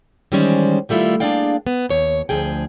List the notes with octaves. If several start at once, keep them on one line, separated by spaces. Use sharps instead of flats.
D#3 E3 G3 G#3 C#4 C5
D#3 G3 A3 E4 F4
A#3 D4 G#4 D5 F5 G5
B3
D#2 C#5
D2 F3 G#4 G5